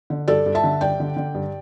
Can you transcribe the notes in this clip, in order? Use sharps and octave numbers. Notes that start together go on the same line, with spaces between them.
D3
G2 A4 D5
G2
E5 A5
D3
G2 D5 G5
D3
D3
G2